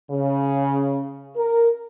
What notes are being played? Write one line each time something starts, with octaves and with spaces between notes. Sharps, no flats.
C#3
A#4